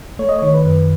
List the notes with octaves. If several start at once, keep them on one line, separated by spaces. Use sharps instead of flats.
A3 C#5
D#5
D#3 C#5
B4
F#2